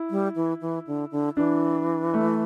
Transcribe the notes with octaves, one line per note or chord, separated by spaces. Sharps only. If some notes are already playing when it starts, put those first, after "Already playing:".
Already playing: E4
G3
E3
E3
D3
D3
E3 D4
A3